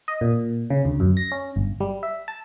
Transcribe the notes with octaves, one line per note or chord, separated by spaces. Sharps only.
D#5
A#2
C#3
D2
F#2
A#6
C#4
G1
G3
E5
A5